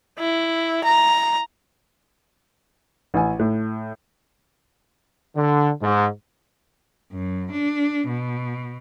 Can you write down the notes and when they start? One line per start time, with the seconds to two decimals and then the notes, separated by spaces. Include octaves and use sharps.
0.19 E4
0.84 A#5
3.14 A1 G#5
3.39 A2
5.36 D3
5.81 G#2
7.13 F#2
7.52 D4
8.08 B2